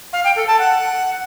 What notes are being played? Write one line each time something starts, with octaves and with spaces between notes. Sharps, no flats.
F5
G5
A4
A5
F#5